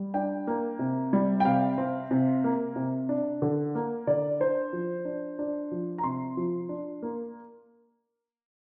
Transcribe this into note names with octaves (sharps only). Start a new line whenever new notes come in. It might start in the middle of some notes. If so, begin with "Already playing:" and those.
Already playing: G3
D4 G5
A#3
C3
G3
G5
C3 F5
C4
C3
A#3
C3
D4
D3
A#3
D3 D5
D4 C5
F3
D4
D4
F3
A#5
C3 C6
F3
D4
A#3